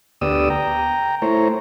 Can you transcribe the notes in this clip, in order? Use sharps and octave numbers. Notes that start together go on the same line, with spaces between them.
D2 B3 G4 D5 D#6 E6
G5 A#5
A3 E4 C5 C#5 A#5